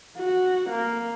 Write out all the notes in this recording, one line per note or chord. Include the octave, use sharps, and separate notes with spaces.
F#4
A#3